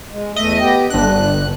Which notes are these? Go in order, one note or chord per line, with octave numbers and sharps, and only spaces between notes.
G#3
E2 A3 D#5 E5
B3 G4 G5
G1 D4 F#6